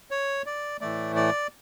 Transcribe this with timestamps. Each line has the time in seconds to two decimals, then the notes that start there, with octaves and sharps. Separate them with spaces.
0.11 C#5
0.46 D5
0.81 A2 E3 A3 D5
1.16 D5